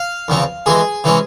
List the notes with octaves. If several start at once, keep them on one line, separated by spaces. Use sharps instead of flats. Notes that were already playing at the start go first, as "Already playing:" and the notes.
Already playing: F5
E2 C#3 F3 C4
F2 E3 G#3 G#4
C3 E3 G#3 C#4